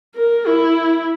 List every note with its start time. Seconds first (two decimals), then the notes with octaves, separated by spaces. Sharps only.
0.15 A#4
0.47 E4